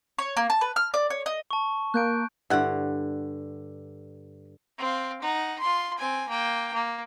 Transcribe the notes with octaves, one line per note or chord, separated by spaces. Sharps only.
C#5
A#3
A5
B4
F6
D5
C#5
D#5
A5 C#6
A#3 F#6 G6 D7
G2 D3 E4 F#5
C4 F5
D#4 F#5
F4 C6
C4 G#5
A#3 G5
A#3